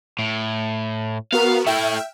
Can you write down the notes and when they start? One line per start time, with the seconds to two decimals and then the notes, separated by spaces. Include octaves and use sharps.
0.19 A2
1.32 B3 F#4 A#4 F5
1.66 A3 E4 E5 G5 F6